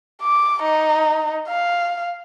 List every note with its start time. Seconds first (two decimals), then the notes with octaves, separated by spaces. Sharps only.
0.22 D6
0.63 D#4
1.48 F5